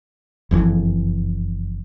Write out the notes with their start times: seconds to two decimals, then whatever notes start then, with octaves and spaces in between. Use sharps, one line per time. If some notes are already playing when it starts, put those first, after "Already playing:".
0.51 F#1 F2 C#3 E3